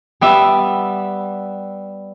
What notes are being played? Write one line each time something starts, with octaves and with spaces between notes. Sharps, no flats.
G3 B3 E5